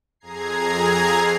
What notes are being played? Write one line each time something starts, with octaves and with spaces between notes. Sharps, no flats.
F2 G#4 A#5 G#6 C7